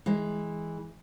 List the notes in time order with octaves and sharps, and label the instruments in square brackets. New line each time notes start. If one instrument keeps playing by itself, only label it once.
[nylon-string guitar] E3 G#3